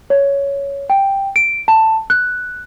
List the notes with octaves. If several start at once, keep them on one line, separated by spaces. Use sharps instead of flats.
C#5
G5
D7
A5
F#6